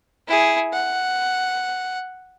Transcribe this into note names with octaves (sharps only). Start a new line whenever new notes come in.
E4 G#4
F#5